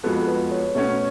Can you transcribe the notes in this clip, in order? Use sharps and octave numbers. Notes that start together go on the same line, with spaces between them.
F2 F3 G#3 B3 F#4 A4
B4
C#5
B2 A3 C#4 F#4 C#5